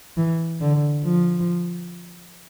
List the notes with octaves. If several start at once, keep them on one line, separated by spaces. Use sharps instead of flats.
E3
D3
F3